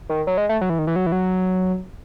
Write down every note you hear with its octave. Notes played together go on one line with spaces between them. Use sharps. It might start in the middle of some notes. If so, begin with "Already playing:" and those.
D#3
F#3
G#3
A3
F#3
E3
D#3
E3
F#3
E3
F#3